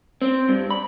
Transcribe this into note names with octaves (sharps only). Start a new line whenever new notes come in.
C4
G2
B5